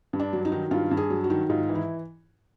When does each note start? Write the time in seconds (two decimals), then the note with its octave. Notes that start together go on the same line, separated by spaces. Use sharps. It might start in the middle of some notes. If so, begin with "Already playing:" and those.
0.13 G2
0.20 D4
0.33 F#3
0.45 D#4
0.52 D#3
0.71 G2 F4
0.91 G2
0.97 G#4
1.10 F#3
1.24 F#4
1.30 D#3
1.49 G#2 F4
1.69 E3
1.75 E4